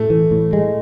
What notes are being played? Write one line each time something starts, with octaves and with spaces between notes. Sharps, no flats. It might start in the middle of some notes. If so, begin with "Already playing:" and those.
Already playing: A2 A3
E3
A2
G#3